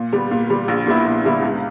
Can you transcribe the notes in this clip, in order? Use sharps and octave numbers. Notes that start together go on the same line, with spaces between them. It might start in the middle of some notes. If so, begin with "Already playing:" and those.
Already playing: A#2
G3 B3
A#2
G3 B3
A#1
A#2 G3 B3 E4
A#1
A#2 G3 B3 E4
C#2